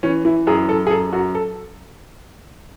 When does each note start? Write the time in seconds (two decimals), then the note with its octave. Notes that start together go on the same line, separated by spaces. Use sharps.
0.03 E3 C#4
0.25 E3 E4
0.47 F#2 G#4
0.68 F#2 A4
0.87 G#4
0.90 F#2 A4
1.13 F#2 F#4
1.35 A4